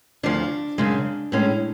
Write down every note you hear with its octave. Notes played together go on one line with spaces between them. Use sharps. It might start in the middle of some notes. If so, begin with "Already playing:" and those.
D2 C#3 F3 D4
F#2 C#3 G#3
A2 G#3 C#4